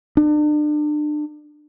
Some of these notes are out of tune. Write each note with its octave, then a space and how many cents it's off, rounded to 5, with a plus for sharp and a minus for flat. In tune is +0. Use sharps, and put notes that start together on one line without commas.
D4 +35